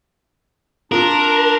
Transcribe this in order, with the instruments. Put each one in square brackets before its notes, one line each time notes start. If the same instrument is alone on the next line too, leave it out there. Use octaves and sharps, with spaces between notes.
[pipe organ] D4 [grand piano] F4 [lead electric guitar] A#4